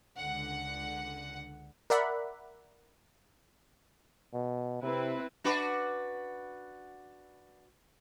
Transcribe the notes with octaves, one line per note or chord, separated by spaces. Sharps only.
C#2 D3 F#5
A#4 D5 E5 F#5 B5
B2
C3 C4 E4 B4
D4 F#4 B4